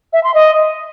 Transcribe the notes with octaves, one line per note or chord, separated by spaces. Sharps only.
E5
C6
D#5